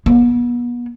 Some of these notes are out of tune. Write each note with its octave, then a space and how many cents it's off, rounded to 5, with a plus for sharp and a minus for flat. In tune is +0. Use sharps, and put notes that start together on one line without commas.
B3 -35